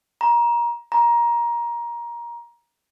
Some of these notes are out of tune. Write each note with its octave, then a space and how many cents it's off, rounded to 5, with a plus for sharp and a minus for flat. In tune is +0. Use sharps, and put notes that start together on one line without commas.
A#5 +25
A#5 +20